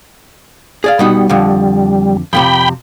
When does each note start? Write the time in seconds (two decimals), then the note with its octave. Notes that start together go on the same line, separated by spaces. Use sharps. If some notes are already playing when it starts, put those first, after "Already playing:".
0.84 G#4 D5 F5
0.99 B2 G3 B3 D#4
1.29 F2 D3
2.33 F2 A2 C3 G5 B5